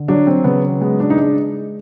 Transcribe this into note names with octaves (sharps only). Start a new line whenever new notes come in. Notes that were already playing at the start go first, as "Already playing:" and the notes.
Already playing: D3
F#3 D4
C4
C#3 B3
G#3 B3
D4
D#4
G#3 D4